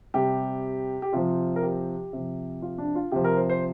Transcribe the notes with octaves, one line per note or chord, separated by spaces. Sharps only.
C3 G3 G4
G4
C3 F3 F4
A#4
G4
C3 F3
F4
D4
F4
C3 F3 G4
A#4
C5
C5